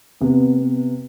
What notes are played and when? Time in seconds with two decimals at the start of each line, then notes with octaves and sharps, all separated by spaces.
0.21 C3 B3
0.60 B3